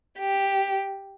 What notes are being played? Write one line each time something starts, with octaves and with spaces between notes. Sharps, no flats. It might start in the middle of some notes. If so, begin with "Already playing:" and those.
G4